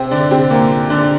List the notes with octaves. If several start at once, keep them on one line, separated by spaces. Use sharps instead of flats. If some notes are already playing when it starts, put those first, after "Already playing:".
Already playing: C3 C4
D3 D4
C3 C4
A#2 A#3
D3 D4